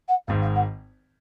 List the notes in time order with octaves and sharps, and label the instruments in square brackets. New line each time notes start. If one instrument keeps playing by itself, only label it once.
[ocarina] F#5
[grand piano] G#1 G#2 D#3 [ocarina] F5
[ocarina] F5
F#5